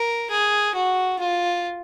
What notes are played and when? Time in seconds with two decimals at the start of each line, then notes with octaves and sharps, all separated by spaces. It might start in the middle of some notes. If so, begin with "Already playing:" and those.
Already playing: A#4
0.30 G#4
0.75 F#4
1.19 F4